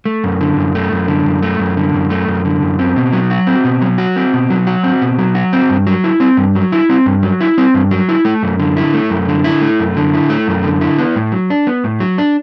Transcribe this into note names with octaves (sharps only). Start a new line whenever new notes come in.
A3
F#2
D3
F#2
A3
F#2
D3
F#2
A3
F#2
D3
F#2
A3
F#2
D3
F#2
C4
B2
F#3
F#4
C4
B2
F#3
F#4
C4
B2
F#3
F#4
C4
B2
F#3
F#4
C4
G2
F#3
E4
C4
G2
F#3
E4
C4
G2
F#3
E4
C4
G2
F#3
E4
A3
F#2
D3
E4
A3
F#2
D3
E4
A3
F#2
D3
E4
A3
F#2
D3
E4
B3
A2
F#3
D4
B3
A2
F#3
D4